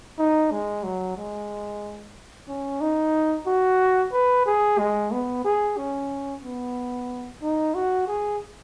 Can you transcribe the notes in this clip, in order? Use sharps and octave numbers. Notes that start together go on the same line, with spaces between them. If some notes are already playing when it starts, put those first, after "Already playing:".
D#4
G#3
F#3
G#3
C#4
D#4
F#4
B4
G#4
G#3
B3
G#4
C#4
B3
D#4
F#4
G#4